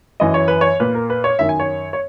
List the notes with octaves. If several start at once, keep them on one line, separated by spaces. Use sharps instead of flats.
F#2 E3 D#5
C#5
B4
C#5
A#2 B4
A#4
B4
C#5
F#2 D#3 E5
G#5
C#5
C#5